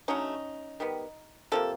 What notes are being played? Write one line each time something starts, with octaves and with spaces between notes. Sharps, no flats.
D3 F#3 A3 C#4 D#4
D#3 G3 B3
C3 F3 A#3 A4